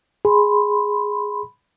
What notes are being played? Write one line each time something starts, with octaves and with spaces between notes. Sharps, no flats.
G#4 B5 C6